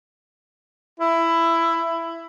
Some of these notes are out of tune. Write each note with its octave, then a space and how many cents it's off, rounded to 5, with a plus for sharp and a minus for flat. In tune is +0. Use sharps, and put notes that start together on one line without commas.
E4 +15